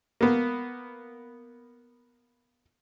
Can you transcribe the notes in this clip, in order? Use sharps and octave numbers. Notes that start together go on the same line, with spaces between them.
A#3 B3